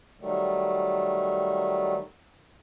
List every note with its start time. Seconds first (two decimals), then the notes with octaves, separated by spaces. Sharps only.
0.20 D#3 F#3 G3 A3